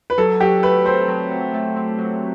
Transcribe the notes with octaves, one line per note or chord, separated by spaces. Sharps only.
B4
F#3 A4
F#3 G4
A3 B4
C4 C5
F#3
F#3
A3
C4
F#3